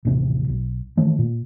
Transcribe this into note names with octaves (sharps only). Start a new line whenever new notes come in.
D#1 A1 C3 C4
B1
D#3 E3 A3
A#2